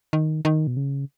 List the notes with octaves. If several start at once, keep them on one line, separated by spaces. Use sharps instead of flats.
D#3
D#3
B2
C#3